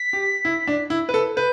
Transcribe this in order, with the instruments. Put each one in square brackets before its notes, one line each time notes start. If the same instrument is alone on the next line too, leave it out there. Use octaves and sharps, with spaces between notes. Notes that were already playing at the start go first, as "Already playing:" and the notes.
Already playing: [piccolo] B6
[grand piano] G4
E4
D4
E4
B4
A4
[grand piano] B4 [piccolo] G6